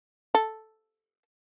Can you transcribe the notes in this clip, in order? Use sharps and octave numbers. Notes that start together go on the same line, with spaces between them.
A4